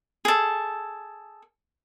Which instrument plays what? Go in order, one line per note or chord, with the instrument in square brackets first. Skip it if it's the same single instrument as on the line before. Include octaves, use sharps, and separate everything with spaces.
[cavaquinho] G#4 A4